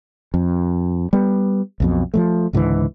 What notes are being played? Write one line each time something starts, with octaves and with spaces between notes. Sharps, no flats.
F2
G3 B3
B1 F2 B2
F3 G3 A3
C#2 G#2 D3 E3